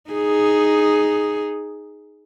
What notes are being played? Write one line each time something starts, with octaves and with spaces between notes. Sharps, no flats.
D#4 G#4